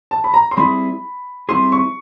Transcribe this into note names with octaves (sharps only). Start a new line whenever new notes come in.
A5
B5
A#5
C6
G3 C4 E4 G#4 B5
G3 C4 E4 G#4 C6
C#6